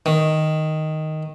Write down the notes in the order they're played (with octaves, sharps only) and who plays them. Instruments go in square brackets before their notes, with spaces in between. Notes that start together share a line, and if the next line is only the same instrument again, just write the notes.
[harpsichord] D#3